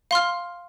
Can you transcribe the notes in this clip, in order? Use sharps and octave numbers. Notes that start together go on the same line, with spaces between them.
F5 C6 F6